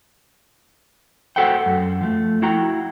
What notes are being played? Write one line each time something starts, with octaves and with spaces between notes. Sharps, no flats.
F#4 A4 C5 F#5 G5
F#2
F3 A3
E4 F#4 G5 A#5